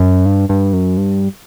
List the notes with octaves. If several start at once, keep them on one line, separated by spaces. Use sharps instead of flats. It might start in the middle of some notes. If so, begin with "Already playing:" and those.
Already playing: F#2
G2
G2
F#2
G2